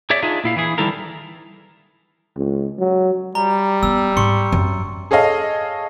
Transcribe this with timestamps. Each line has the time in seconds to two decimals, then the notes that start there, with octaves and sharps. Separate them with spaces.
0.10 G#4 C#5 D5 E5
0.22 D4 D#4 F4 G#4 E5
0.44 A#2 E4 F5
0.56 E3 E4 G#4
0.78 D#3 E3 G3 E4 A4 A#4
2.36 C#2
2.79 F#3
3.35 G3 A#5
3.83 B3 E6
4.17 G#2 C6 C#6 C#7
4.52 F#2
5.11 G#4 A4 C#5 D#5 F5